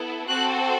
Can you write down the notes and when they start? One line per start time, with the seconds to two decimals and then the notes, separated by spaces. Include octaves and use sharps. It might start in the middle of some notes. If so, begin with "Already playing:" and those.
Already playing: B3 E4 A4
0.29 C4 F#4 A4 F#6